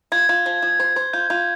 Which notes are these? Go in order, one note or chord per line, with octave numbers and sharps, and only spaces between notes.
F4 G#6
F4
F3
F3
C5
C5
F4 G6
F4